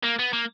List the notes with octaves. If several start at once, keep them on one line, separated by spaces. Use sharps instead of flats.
A#3
B3
A#3